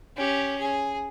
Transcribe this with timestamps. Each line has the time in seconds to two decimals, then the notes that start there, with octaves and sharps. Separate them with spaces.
0.17 C#4 G4
0.59 G#4